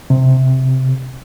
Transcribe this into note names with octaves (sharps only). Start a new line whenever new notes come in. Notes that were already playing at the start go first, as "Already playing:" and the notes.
C3